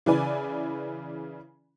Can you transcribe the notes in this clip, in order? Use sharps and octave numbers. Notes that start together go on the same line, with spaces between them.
C#3 E3 E4 B4 D5 G#5